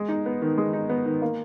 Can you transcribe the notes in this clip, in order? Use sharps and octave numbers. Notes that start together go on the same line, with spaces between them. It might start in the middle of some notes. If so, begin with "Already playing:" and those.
Already playing: G#3
D#4
B3
D#3
G#3
D#4
B3
D#3
A#3